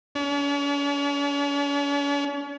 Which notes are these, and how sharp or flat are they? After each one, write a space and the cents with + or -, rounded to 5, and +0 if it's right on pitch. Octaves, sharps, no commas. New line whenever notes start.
C#4 +45